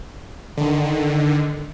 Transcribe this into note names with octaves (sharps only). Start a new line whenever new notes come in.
D3 D#3